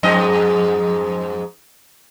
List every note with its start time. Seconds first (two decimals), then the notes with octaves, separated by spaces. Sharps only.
0.03 F2 G#2 D#5